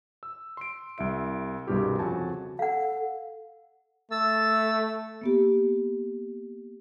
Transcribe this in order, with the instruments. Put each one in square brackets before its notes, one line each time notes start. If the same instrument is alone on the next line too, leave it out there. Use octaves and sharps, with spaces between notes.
[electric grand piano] E6
C6 D7
C2 E4 E5 D7
C2 G2 B2 E4 G4 G#4
F2 C#3 F#4 G#5 A5
[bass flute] A4 [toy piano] F5 F#5
[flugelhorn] A3 [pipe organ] E6 A6
[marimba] A#3 B3 G4